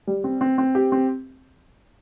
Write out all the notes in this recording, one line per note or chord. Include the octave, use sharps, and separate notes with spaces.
G3
C4
C4
C4
G4
C4